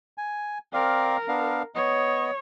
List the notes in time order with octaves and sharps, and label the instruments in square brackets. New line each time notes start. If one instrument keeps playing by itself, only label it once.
[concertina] G#5
[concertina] C4 D5 F5 [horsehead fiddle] A#4
[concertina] B3 D4 F5
[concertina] B3 D#5 [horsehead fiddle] C#5